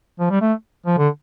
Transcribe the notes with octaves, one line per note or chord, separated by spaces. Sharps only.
F3
G3
A3
F3
D3